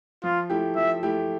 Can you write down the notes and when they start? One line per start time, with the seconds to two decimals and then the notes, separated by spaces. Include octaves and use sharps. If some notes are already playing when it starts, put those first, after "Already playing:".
0.24 F3 F4
0.50 A3 E4 G4
0.76 F3 E5
1.03 A3 E4 G4